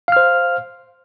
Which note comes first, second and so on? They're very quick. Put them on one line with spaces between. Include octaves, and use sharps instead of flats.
F5 F6 C5